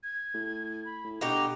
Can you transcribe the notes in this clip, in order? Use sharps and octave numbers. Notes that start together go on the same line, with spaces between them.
G#6
A2
G#6
B5
A2
B2 D3 D#4 G4 F7